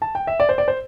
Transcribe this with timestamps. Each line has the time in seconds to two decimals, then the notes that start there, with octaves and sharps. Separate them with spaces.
0.02 A5
0.15 G5
0.27 E5
0.40 D5
0.49 C5
0.58 D5
0.68 C5